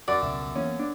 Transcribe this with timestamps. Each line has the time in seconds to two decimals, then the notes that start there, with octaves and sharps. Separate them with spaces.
0.08 F#2 F#4 D5
0.22 C#2 B2 E5
0.56 E3 A#3 B3 C#4
0.80 D4